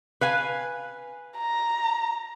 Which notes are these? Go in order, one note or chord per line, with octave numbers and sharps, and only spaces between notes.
B4 F5 G#5
A#5